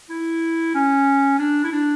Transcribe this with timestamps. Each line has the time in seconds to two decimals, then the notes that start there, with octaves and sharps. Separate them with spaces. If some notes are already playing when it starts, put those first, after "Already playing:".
0.10 E4
0.75 C#4
1.39 D4
1.64 E4
1.72 D4